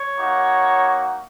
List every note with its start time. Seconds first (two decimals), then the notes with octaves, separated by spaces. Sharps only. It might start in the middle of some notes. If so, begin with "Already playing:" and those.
Already playing: C#5
0.18 A#3 D#4 F#4